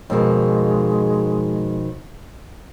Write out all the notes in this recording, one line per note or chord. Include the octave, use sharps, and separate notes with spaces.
F2 B2 D#3 G#3